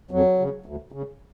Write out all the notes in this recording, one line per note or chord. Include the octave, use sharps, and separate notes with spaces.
F2 F#3
C#3
D2
C#3